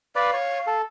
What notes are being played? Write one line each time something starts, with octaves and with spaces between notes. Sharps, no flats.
B4 D5 F5
C#5
A4